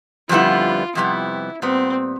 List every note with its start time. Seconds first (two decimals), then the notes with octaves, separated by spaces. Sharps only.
0.29 F2 D3 G3 B3 E4 F4
0.95 F2 C3 G3 B3 E4
1.62 A#2 G3 B3 C4